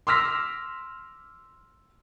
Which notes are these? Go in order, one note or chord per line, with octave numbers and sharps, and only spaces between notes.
C6 D6 E6 F6 A#6 B6